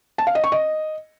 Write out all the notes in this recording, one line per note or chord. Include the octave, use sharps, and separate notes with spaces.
A5
F5
D#5
C#6
D#5